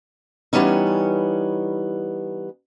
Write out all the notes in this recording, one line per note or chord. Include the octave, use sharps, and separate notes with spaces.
E3 F3 G3 B3 C#4 D#4